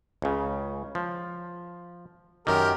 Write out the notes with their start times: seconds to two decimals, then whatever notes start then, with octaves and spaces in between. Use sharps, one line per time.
0.22 C#2 C#3
0.95 F3
2.47 F#2 D#3 G4 A#4